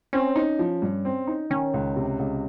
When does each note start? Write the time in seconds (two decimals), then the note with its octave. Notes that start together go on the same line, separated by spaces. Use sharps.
0.13 C4 C#4
0.36 D#4
0.59 F3
0.82 G2
1.05 C4
1.27 D#4
1.50 D#3 C#4
1.74 C#2
1.96 C3
2.19 C#2